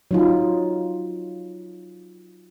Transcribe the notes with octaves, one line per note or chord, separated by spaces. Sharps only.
F#3 D#4 F4